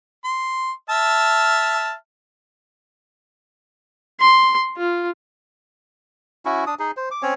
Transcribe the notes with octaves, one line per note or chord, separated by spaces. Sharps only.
C6
E5 A5 F6
C6
F4
C#4 E4 F#4
D4 D#6
D#4 G#4
C5
D6
C4 C#4 C#5